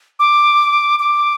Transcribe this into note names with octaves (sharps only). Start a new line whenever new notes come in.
D6
D6